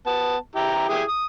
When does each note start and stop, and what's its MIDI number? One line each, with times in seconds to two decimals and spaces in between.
0.06 0.36 59
0.06 0.36 81
0.55 0.89 64
0.55 0.89 67
0.55 0.89 82
0.89 1.03 64
0.89 1.03 67
0.89 1.03 68
1.08 1.26 87